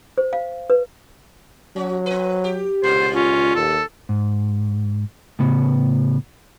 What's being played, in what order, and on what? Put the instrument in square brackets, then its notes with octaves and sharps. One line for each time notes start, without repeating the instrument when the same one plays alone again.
[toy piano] C5
F5
B4
[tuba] F#3 [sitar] C#4 F#4
[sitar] C4 B4
G4
[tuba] C#2 [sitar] G2 A#2 A3 [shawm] C5
[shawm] C#4 [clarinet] F4
[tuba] D#2 [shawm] A4
[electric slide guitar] G#2
A2 C#3 B3